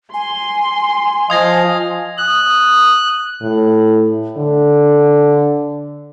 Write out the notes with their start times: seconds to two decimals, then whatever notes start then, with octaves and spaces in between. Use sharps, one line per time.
0.14 G#5 C6
1.30 F3 D#5 F5 D#6 G#6 A#6
2.18 D#6 F#6
3.42 A2
4.37 D3